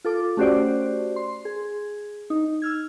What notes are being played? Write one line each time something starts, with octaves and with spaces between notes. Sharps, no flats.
F4 A4 D6
A3 C#4 F#4 G4 C5 D5
C6
G#4
D#4
E6 F6 G#6